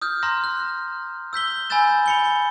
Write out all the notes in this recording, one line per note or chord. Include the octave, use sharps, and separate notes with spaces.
D#6 F6 G6
A#5 C6 F6 A#6
F#6
E6 G6 B6 G7
G#5 B5 E6 G6 A6 E7
B5 C#7 G7